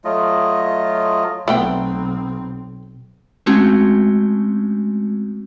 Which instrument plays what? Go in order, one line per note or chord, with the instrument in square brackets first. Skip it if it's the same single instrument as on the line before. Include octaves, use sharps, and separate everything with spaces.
[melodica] F#3 A3 F4 D#5
[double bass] B1 C4 [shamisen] A3 B3 G5
[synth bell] G#3 A3 C4 C#4 F#4